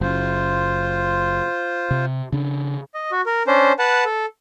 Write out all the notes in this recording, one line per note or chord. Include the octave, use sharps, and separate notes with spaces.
F#1 F4 C5
C3
C#3 D4
D#5
F#4
A#4
C#4 D4 C5
B4 F#5 A5
A4